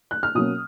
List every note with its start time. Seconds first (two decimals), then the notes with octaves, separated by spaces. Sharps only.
0.11 F#6
0.23 F6
0.35 B2 F#3 A#3 C#4 D#6